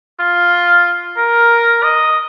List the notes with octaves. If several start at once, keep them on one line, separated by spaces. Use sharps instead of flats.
F4
A#4
D#5